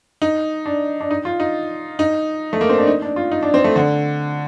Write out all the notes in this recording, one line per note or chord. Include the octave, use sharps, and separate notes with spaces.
D#4
D4
D4
D#4
F4
D#4
D#4
A3
A#3
C4
D4
D#4
D4
F4
D#4
D4
C4
A3
D3